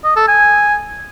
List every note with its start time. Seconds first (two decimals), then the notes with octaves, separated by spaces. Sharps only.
0.04 D#5
0.16 A4
0.28 G#5